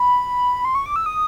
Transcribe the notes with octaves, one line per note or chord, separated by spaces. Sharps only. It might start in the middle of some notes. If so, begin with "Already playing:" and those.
Already playing: B5
C6
C#6
D6
E6
D#6